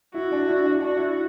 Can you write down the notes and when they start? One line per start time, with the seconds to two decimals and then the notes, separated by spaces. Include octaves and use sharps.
0.14 E4 F#4
0.32 D4
0.47 E4
0.64 D4
0.80 D4 F#4
0.97 E4